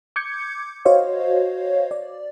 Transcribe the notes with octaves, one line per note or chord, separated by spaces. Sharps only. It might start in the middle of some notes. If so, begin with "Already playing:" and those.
D6 G6 G#6 C#7
F#4 C5 C#5 D#5 F5
D5